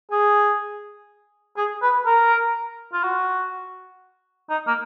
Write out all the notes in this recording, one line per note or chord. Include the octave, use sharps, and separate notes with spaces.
G#4
G#4
B4
A#4
F4
F#4
D#4
A#3